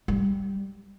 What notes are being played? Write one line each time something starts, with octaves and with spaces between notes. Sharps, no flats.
G3